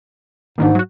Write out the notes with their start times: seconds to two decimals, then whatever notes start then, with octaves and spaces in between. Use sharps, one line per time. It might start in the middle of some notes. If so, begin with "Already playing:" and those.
0.58 D#2 G#2 D#3 D4
0.75 F#3 F#4